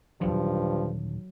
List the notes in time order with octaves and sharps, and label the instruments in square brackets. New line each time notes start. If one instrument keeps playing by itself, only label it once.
[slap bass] D#1 B1 D3 [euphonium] G2 [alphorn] F3 [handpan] F#3